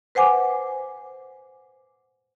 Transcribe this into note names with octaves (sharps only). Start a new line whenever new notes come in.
B4 C5 F#5 G#5 D6